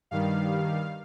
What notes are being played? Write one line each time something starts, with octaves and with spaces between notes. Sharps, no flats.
G2 D#3 G3 F5